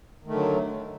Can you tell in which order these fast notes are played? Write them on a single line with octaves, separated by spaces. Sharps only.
D#3 A3 D3 F#3